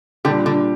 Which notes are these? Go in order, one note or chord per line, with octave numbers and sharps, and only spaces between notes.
A#2 D3 G3 D4 G4
D3